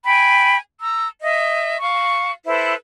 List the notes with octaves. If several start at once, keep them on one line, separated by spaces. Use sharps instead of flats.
G5 G#5 B5
A#5 E6
D#5 E5
F5 C#6
E4 A4 B4 C5